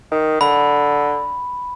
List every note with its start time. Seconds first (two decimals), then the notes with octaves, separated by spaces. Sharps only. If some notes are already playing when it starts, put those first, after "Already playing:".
0.12 D#3
0.41 D3 B5